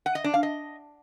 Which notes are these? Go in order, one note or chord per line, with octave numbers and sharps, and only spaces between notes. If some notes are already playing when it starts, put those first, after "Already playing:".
F#5
D#5
D4
F5
D#5